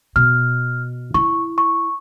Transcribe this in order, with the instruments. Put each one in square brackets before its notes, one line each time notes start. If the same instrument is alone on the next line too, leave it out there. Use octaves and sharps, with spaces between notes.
[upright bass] B2 [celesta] F6
[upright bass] E4 [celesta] C#6
[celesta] C#6